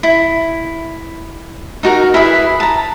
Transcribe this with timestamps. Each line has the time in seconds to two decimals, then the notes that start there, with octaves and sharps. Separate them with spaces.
0.03 E4
1.83 D#4 F#4 A#4
2.14 E4 G#4 B4 E5
2.60 A5 A#5